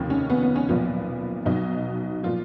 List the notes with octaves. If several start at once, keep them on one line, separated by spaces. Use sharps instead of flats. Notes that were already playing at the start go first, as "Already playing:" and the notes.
Already playing: F1 D#2 C#3 F3 D#4
C#4
B3
B3
C#4
B1 A#2 F3 B3
B1 B2 F#3 D#4
A#2 F3 F4